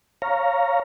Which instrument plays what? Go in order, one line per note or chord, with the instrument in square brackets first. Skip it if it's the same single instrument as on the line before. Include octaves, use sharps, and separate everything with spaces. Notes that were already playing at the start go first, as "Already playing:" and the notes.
[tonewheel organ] C#5 F5 A#5